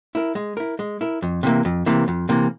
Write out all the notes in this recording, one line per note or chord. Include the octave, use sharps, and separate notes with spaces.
E4 A#4
G#3
E4 A#4
G#3
E4 A#4
F2
C3 E3 A#3
F2
C3 E3 A#3
F2
C3 E3 A#3